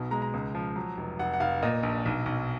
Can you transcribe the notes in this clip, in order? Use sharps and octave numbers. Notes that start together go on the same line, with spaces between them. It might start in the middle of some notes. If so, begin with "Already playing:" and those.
Already playing: B1 B2
G#3 A#5
A#5
C#2
F3
F#3
F1
F1 F#5
F#5
F1 F5
A#2 D#5
A#1
B1
B1